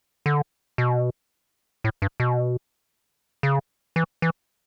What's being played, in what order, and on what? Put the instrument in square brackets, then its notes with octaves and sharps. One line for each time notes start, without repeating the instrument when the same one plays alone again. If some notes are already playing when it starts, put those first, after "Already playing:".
[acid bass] D3
B2
A2
G2
B2
C#3
E3
E3